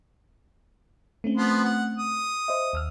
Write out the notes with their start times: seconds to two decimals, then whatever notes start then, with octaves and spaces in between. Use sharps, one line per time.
1.24 A3 C4 C#4
1.37 F3 B3 C6
1.64 F#5
1.98 D#6
2.48 C5 D#5 E5
2.73 D#2 E6 F6